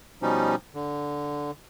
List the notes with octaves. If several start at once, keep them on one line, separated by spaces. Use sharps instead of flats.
B2 F3 G3 C#4 D#4
D3